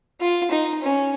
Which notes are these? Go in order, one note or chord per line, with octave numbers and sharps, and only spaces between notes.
F4
D#4
C#4